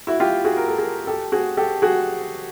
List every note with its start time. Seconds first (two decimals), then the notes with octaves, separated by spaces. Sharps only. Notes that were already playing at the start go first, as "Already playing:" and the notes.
0.07 E4 F#4
0.20 F4 G4
0.45 F#4 G#4
0.57 A#4
0.68 A4
0.78 G#4 A#4
1.07 G4 A4
1.32 F#4 G#4
1.57 G4 A4
1.82 F#4 G#4